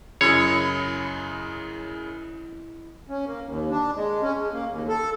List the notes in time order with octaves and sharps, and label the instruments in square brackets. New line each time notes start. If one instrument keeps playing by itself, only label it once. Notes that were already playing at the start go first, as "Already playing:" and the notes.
[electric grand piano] F#2 C#3 [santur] E4 D#5 [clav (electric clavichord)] C#5
[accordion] C#4
A#3
D#2
D4
G#3
C#4
G#3
A#3
D#2
A4